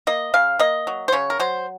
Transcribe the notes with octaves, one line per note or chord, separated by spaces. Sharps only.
A#3 D#5
C#3 F5
A#3 D#5
F#3
C5
C#3 C#5
A#4
F#3 C5